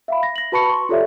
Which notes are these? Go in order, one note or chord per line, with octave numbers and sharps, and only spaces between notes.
E5 F5 B5
A#6
A#6 F#7
F#4 B4 A5 B5 C#6 C#7
C6 C#6
F4 G4 A4 C#5 D5 E5